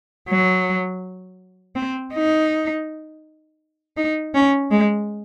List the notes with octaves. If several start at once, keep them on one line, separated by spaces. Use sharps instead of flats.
F#3
C4
D#4
D#4
C#4
G#3